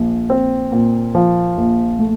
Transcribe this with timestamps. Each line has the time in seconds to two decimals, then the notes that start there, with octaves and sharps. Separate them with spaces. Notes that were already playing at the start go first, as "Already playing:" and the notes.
Already playing: A#1 F3
0.30 C4
0.72 A#2
1.15 F3
1.57 A#1
1.99 A3